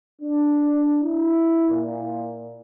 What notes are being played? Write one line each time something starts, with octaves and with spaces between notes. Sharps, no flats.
D4
E4
A#2